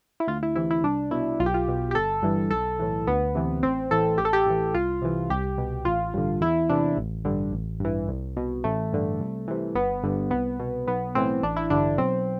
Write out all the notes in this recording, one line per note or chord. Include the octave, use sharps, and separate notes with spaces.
E4
D2 F4
E4
C3 E3 E4
E4
C2 D4
B2 E4
B1 F4
G4
F4
B2
G4
G1 A4
G2 E3
B1 A4
A2 E3
D2 B3
C3 E3
A1 C4
A2 E3 A4
A1 G4
A4
G4
A2 E3
C2 F4
C3 E3
C2 G4
B2
A1 F4
G2 D3
E2 E4
C3 E3 D4
A1
G2 D3
A1
G2 E3
C2
B2
A1 A3
G2 D3
C2
C3 E3
G1 B3
G2 D3
C2 B3
B2
B1 B3
A2 E3 C4
A1 D4
E4
G2 D3 D4
B1 C4